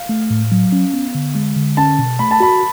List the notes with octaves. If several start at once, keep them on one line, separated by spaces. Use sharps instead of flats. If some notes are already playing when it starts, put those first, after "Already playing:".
Already playing: F5
A3
A2
F#3
C#4
B3
D3
G#3
D3
C#4 A5
B2
A3 B5
A5
F#4 B5